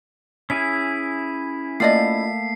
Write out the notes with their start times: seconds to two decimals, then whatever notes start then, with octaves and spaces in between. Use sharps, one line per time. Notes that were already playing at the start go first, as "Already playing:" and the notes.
0.50 C#4 E4 G#4 B6
1.80 A3 A#3 F4 D5 D#5 A5 C7